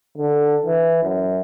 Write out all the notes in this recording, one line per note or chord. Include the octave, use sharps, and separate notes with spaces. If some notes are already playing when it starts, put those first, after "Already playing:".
D3
E3
F#2